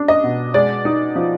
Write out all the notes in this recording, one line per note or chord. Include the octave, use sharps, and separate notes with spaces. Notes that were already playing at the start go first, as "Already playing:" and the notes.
Already playing: D4
D#5
B2
G#3 D5
D#4
F3